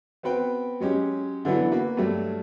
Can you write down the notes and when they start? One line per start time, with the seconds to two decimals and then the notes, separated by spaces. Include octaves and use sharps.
0.23 B3 C4 F#4 B4 G5
0.80 F#3 G#3 C#4 G4
1.45 D3 E3 F#3 B3 E4
1.72 A#3 F#4 B4
1.97 G2 F#3 A3